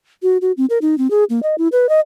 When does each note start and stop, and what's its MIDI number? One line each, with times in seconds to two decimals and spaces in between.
0.23 0.38 66
0.42 0.52 66
0.57 0.66 60
0.70 0.78 70
0.82 0.98 63
0.98 1.10 60
1.11 1.24 68
1.30 1.40 58
1.43 1.55 75
1.58 1.68 64
1.72 1.89 71
1.89 2.00 75